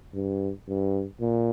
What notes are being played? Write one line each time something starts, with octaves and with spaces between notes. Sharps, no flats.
G2
G2
A#2